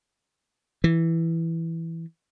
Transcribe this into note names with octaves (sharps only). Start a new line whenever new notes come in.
E3